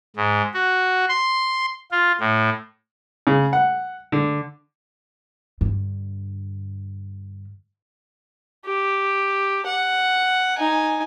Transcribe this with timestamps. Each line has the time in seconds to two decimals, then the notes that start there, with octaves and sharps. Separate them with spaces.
0.16 G#2
0.54 F#4
1.09 C6
1.91 F4
2.20 A2
3.27 C#3
3.53 F#5
4.12 D3
5.61 G2 D3
8.66 G4
9.66 F#5
10.58 D#4 G#5